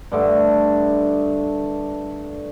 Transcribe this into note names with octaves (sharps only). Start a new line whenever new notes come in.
G2 D3 A3